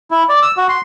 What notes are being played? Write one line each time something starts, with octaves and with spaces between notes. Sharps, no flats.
E4
D5
E6
F#4
C6